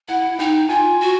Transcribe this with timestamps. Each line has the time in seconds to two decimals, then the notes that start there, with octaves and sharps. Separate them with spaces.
0.08 E4 F#5
0.39 D#4 G5
0.69 F4 G#5
1.01 F#4